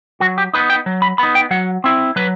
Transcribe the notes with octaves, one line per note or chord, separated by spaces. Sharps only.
F#3 F#4
G4
B3 D#4 B4
G5
F#3
B5
B3 D#4 B5
G5
F#3 F#5
C4 E4
F#3 B4